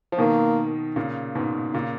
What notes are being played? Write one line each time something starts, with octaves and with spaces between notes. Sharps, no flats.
F3
B2 D#3 A#3
A#2 C#3
G#2 B2
A#2 C#3